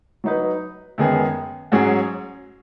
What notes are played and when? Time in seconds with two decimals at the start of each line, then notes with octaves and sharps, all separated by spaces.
0.24 F#3 D#4 B4
0.98 F#2 D#3 G#3 B3 G#4
1.72 G#2 F#3 C#4 G#4